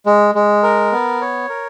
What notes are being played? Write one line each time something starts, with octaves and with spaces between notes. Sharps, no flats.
G#3
G#3
A#4
B3
C#5
A#4